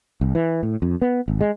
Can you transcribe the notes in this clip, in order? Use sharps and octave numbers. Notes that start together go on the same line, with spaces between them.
C2
E3
A2
F2
B3
G#1
G#3